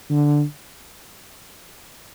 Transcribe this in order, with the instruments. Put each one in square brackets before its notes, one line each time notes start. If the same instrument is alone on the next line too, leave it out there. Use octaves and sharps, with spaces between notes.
[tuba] D3